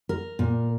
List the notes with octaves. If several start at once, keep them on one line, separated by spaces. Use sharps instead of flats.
A#4
A#2